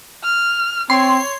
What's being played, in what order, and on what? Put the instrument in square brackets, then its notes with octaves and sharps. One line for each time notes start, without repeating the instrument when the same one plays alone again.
[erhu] F6
[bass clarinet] C4 [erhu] C#5 [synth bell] C6